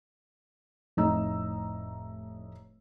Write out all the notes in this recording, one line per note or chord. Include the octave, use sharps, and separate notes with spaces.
F1 A2 D#4 A#5 E6